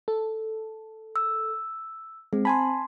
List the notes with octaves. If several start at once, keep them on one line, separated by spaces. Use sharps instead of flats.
A4
E6
G#3 C4
G#5 A5 B5 C6